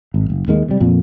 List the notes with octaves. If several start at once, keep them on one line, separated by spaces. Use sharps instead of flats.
G#1
F#1
D#2 D#3 G#3
C3 G3
F2 A#2